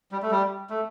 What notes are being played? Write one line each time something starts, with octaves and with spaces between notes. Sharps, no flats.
G3
A3
G3
A3